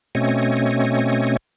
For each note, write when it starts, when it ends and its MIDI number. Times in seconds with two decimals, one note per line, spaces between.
0.15 1.37 47
0.15 1.37 57
0.15 1.37 60
0.15 1.37 61
0.15 1.37 73
0.15 1.37 75